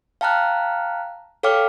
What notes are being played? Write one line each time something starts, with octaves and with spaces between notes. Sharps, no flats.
F5 G5 A5 A#5 F6 F#6
A4 C#5 F5 G5 D6 F6